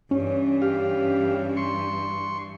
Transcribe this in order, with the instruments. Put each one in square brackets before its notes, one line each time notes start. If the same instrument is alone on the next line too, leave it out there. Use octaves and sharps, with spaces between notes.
[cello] G2 E3 [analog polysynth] C#4
[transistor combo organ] G4 F5
C6 C#6